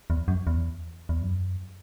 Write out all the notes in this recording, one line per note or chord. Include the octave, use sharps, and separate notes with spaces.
E2
F#2
E2
E2
F#2